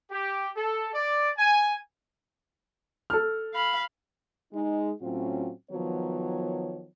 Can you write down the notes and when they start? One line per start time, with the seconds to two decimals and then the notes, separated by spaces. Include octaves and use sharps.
0.11 G4
0.56 A4
0.93 D5
1.38 G#5
3.10 A4 F6
3.54 F5 B5
4.53 G#3 D#4
5.01 A2 F#3 C4 C#4 F4
5.71 D#3 F3 F#3 B3 C#5